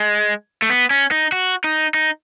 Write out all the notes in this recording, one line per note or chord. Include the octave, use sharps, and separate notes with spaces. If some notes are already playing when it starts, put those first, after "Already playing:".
Already playing: G#3
A3
B3
C#4
D#4
F#4
D#4
D#4